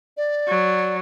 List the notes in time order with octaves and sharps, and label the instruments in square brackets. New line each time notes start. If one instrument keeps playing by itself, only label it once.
[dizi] D5
[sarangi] F#3